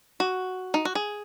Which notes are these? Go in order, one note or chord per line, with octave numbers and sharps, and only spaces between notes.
F#4
D#4
F#4
G#4